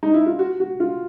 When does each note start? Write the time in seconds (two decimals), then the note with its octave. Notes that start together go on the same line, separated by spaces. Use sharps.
0.03 D#4
0.14 E4
0.26 F4
0.39 F#4
0.60 F#4
0.80 F4